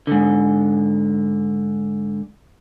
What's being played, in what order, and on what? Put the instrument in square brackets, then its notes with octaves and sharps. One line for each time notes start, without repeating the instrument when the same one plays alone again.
[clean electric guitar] G#2 D3